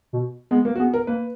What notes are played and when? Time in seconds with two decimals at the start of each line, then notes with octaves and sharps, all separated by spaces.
0.13 B2
0.51 G#3 B3
0.65 A#3
0.75 F#4
0.79 B3 G#4
0.94 A#4
1.07 A#3 B4